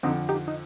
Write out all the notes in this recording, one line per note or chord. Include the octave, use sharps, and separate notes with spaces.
F2 D3 F3 C4 D#4
D#4 G4
D#4